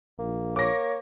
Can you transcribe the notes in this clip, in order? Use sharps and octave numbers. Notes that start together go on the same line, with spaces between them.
A#1 A#3
A#3 C#5 D6 A#6